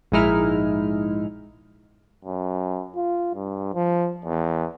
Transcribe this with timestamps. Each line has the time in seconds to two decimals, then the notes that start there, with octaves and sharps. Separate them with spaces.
0.12 A#1 G#2 G#3 D#4 E4 F6
2.25 F#2
2.96 F4
3.35 G2
3.74 F3
4.25 E2